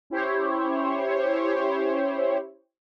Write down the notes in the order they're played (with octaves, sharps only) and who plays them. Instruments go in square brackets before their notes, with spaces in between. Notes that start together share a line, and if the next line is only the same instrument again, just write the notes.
[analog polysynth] C#4 E4 G4 C5 C#5